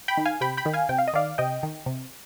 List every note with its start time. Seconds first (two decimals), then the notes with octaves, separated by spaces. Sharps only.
0.08 G5 B5
0.17 D#3
0.26 F5 G#5
0.41 C3 G5 B5
0.57 G5 B5
0.65 D#3
0.73 F5 G#5
0.89 C3 G5
0.98 F5
1.08 D#5
1.13 D#3 D5 F5
1.38 C3 D#5 G5
1.63 D#3
1.86 C3